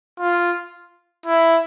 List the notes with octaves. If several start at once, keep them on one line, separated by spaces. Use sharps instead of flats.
F4
E4